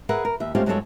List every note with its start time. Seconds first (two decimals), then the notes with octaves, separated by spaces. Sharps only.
0.09 G#4 A#4 B4 E5 F#5
0.25 A#4
0.40 D#2 E5
0.55 G#3 A3 C4 C#4 F4 G4
0.66 G2 F#3 G#3 C4 A4 C#5